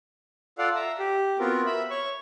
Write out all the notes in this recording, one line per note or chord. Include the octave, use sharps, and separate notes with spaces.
F4 A4 D5 F5 F#5
E5 A#5
G4
B3 C4 F4 F#4 A#4
E5 B5
C#5 C#6